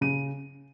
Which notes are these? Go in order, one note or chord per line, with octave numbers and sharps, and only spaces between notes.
C#3 D#7